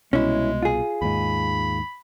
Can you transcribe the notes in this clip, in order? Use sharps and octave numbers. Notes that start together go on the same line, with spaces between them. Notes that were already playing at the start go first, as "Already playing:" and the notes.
C2 B2 G#3 C#4 E4
F4 G#4
D#2 G#2 B5